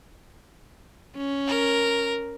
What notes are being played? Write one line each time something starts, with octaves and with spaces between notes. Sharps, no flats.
C#4
A#4